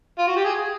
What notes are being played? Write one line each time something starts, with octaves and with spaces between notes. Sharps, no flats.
F4
F#4
G4
G#4